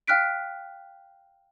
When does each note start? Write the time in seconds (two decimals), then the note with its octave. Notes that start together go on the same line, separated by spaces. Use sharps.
0.07 F5 G5 F6 F#6 B6 D7